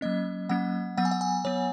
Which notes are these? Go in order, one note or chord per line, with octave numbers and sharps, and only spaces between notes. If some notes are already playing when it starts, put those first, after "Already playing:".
F#3 A#3 C#4 D#5
F#3 A#3 C#4 F#5
F#3 B3 F#5
G#5
F#5
G#5
F#3 B3 C#5